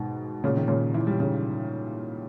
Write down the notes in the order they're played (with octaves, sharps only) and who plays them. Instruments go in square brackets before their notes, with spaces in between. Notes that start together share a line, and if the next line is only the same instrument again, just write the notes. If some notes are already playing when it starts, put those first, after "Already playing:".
Already playing: [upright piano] G#2 B2 D#3
A#2 C#3
D#3
A#2 C#3
E3
G3
C#3 E3